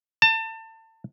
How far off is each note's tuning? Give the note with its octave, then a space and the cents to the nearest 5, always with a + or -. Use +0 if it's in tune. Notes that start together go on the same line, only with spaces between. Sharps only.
A5 +30